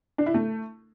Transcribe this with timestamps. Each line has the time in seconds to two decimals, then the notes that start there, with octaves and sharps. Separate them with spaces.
0.18 D4
0.26 E4
0.34 A3